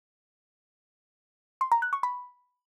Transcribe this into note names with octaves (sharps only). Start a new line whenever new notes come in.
C6
A#5
F#6
C#6
B5